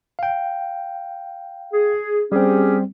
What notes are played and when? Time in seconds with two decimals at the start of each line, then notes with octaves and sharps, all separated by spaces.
0.19 F5 G5
1.74 G#4
2.32 G3 C4 C#4 G4 G#4